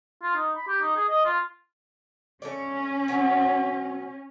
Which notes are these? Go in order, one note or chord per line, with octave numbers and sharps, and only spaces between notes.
F4
D#4
B5
G4
D#4
G#4
D#5
F4
A3 C#4 C#5 D5
B2 F#3